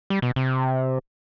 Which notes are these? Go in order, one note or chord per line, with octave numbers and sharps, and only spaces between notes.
G3
B2
C3